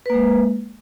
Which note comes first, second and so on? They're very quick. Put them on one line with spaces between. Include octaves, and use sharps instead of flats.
B4 A#3 G#3